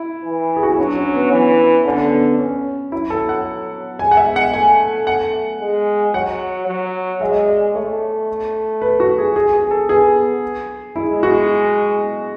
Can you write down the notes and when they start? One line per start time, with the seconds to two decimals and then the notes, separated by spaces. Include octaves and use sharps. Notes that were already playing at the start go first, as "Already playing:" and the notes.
Already playing: E4
0.25 E3
0.56 G#4
0.63 F#4
0.70 E4
0.78 F#3 D4
0.96 C#4
1.14 B3
1.32 E3
1.85 D3 C#4
1.93 B3
2.06 B3
2.38 C#4
2.92 F#3 E4
3.10 A4
3.29 F#5
3.99 G#3 G#5
4.11 F#5
4.17 E5
4.36 F#5
4.53 A3 G#5
5.07 F#5
5.60 G#3
6.14 F#3 F#5
6.68 F#3
7.21 G#3 E5
7.48 D5
7.75 A3 C#5
8.82 B4
9.00 F#4
9.18 G#4
9.36 G#4
9.53 G#4
9.71 A4
9.89 B3 G#4
10.96 G#3 E4
11.23 F#4